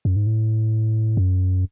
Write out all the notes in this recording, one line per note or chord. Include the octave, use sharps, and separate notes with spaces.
F#2
G#2
A2
F#2